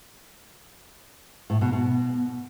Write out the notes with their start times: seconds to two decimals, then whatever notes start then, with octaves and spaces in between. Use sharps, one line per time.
1.50 A2
1.61 B2
1.73 B2